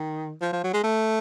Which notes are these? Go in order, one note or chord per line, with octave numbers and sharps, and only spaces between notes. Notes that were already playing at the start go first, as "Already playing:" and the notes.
Already playing: D#3
F3
F3
F#3
G#3
A3